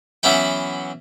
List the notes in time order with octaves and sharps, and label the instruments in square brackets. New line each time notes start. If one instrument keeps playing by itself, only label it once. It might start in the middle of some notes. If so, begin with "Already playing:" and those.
[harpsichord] E3 F#3 B3 C#4 E4 G5